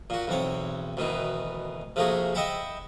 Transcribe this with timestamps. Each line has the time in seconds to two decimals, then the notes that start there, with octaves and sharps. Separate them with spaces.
0.10 A#2 F#4
0.27 B1 E2 C4 C#5
0.97 D2 B2 D#3 E3
1.96 C3 F3 A3 A#3 F#4 G#4
2.35 D#5 E5 F#5 G5 A5 B5